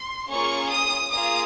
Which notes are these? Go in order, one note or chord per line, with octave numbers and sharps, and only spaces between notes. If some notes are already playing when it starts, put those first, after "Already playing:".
Already playing: C6
A#3 C#4 F4 G#4 C#6
D#6
A#3 F4 G#4 D#6